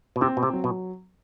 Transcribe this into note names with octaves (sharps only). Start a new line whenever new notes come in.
B2
C3 C4
B2
C3
F#3
B2